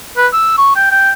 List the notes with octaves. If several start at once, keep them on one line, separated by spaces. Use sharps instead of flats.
B4
E6
C#6
G5
G5